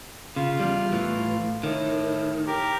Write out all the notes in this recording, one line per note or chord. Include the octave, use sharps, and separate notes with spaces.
C#3 F4
E2 G3
A2 E3
A2 D#3
G4 A#4